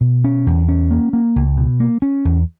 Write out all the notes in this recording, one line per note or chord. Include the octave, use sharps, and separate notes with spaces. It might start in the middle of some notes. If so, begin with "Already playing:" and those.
B2
C#4
E2
C#4
A#3
A#3
C#2
B2
A#3
C#4
E2